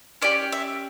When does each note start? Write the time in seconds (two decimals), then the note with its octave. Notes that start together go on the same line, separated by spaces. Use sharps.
0.22 C#4 G4 D5
0.52 E5